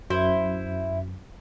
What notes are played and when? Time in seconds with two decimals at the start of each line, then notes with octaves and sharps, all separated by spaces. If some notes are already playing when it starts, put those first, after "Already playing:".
0.10 F#2 E4 C5